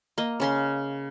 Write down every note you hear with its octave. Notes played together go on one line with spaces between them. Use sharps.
A#3 D#5
C#3 C#4 C6